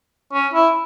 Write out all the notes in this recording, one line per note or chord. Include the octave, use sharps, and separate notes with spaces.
C#4
E4